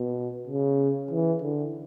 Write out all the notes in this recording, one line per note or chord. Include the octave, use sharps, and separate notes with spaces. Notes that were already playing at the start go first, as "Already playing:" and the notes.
Already playing: B2
C#3
E3
D3